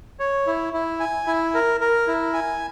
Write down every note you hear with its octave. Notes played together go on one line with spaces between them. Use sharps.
C#5
E4
E4
G#5
E4
A#4
A#4
E4
G#5